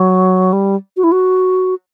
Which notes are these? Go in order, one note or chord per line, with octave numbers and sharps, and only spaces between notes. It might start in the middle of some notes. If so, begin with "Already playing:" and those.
Already playing: F#3
G3
F#4
E4
F#4